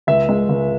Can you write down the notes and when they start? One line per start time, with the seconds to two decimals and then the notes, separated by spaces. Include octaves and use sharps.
0.07 C#2 E5
0.29 G#3
0.49 C#2